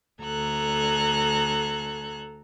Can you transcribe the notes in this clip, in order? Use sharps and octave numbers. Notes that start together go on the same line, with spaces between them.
D2 A4 A#5 F#6 G#6